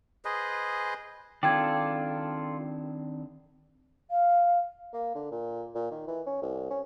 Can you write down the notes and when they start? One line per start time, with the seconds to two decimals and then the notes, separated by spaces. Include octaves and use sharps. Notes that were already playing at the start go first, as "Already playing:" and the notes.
0.25 G#4 B4 C5 D#5
1.43 D#3 C4 D4 F4 A4 D5 G5 G#6
4.10 F5
4.93 A#3
5.15 D3
5.31 A#2
5.75 A#2
5.91 D#3
6.08 E3
6.26 C#4
6.42 C2
6.71 C#4